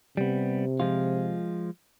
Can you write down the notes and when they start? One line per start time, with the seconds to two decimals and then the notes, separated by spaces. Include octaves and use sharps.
0.17 C3 G3 B3
0.80 F3 G#3 F4